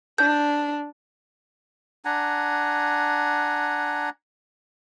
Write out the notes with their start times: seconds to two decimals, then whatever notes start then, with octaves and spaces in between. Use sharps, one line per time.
0.18 D4 G6
2.05 D4 F#5 G#5 A#5